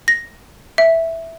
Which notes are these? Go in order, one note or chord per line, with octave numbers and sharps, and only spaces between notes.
A#6
E5